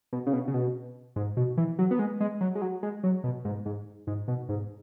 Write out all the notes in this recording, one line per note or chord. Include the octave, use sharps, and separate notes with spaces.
B2
C#3
B2
C#3
B2
G#2
B2
E3
F#3
B3
G#3
G#3
F#3
G#3
F#3
G#3
F#3
B2
G#2
G#2
G#2
B2
G#2